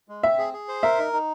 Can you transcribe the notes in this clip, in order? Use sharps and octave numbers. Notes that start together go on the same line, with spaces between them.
G#3
C4 E5
G#4
G#4
C5
A#4 E5
D#4
D#4